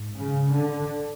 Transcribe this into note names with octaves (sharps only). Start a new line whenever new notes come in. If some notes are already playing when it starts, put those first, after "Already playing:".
Already playing: G#2
C#3
D3